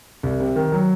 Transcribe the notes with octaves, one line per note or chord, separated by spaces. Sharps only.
C2
C3
D#3
F#3